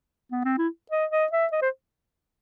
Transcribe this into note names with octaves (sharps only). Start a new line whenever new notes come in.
B3
C4
E4
D#5
D#5
E5
D#5
C5